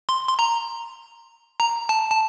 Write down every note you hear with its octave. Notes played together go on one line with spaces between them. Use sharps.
C6
C6
A#5
A#5
A5
A5